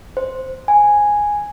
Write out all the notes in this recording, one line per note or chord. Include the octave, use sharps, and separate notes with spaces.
C5
G#5